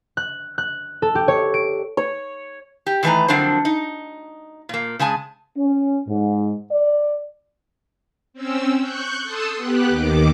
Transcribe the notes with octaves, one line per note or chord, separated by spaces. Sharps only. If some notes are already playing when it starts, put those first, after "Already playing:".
F#6
F#6
A4
G4
C#5
D7
C#5
G4
D#3 E3 A3 B4 G#5 A#5
F2 D3 F#3 D4 A#4 C5
D#4
A#2 A#3
C#3 G#3 G#5 A5
C#4
G#2
D5
C4 C#4 E6
C#6 F#6 G6
A4 A5 C6 D#6 E6
B3 G4 F#6
D#2 D#3 D6